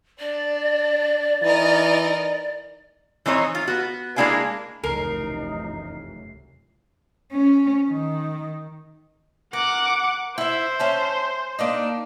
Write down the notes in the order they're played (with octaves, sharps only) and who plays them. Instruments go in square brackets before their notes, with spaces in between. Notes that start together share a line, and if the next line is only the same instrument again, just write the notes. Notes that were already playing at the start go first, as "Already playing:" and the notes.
[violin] D4 [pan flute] D5
[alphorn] E3 [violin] D#4 A#4
[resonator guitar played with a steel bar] E3 C4 D#4 C#5
F4
B3 F#4
G#3 A#3 D4 E4 F5 G#5
[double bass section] F1 F#2 E3 [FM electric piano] C#2 C7 [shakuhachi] D#4 [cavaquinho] A#4
[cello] C#4
D#3
[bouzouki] A#4 [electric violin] F#5 D6
[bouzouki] E4 E5 [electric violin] C5
[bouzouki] C#4 E5 A5
A#3 D4 D#4